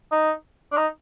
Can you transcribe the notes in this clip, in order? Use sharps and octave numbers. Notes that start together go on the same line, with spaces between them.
D#4
D4
D#4